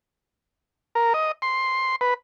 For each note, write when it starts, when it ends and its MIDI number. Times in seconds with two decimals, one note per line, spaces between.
0.95 1.13 70
1.14 1.32 75
1.42 1.96 84
2.01 2.14 71